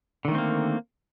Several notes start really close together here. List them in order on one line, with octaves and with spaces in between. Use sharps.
D3 D#3 A3 C4 A#3